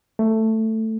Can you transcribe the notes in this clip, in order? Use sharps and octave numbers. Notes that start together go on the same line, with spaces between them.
A3